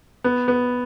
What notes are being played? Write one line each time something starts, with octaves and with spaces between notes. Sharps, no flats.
B3
B3